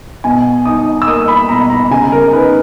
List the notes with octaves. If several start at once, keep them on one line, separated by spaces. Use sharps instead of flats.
B2 G#5
D#4 D#6
E6
A#3 D#6
B5
B2 A#5
A#5
C#3 G#5
A#4
D#4 B4